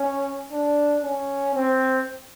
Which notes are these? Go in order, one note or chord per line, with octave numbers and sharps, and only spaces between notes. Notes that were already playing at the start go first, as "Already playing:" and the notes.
Already playing: C#4
D4
C#4
C4